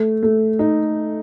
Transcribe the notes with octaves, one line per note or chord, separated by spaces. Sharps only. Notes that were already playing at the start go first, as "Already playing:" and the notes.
Already playing: A3
A3
D#4